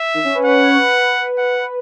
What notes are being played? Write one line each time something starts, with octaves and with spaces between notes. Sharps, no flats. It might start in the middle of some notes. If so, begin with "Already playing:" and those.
Already playing: E5
D#3
C#4
B4
C#5 F#5
C#5
B4
F#5